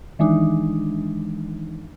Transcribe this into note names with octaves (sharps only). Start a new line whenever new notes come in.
D#3 E3 G#3 D4 D#4